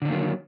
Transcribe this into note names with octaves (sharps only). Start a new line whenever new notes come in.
D3 D#3 F#3 A#3